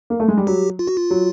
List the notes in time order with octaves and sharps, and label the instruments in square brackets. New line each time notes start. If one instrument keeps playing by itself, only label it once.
[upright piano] A#3
A3
G#3
G3
[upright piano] F#3 [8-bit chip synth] G4
[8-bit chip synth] F4
F#4
F4
[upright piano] F#3